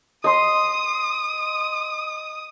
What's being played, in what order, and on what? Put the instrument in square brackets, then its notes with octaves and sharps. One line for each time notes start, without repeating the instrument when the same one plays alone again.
[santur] D#5 C6 [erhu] D#6